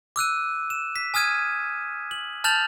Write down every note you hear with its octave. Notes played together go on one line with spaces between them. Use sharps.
D6 E6 F#6 D#7
E7
B6
G#5 D#6 F6 G#6 D#7
F#7
A5 F6 G6 A6 F7 F#7